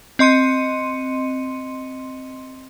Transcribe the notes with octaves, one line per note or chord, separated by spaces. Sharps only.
C4 D#5 C6 C#7 D#7